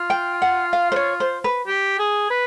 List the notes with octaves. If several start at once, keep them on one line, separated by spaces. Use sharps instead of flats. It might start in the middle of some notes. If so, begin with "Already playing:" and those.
Already playing: F4
G5
F#5
F5
C5
C#5
C5
B4
G4
G#4
B4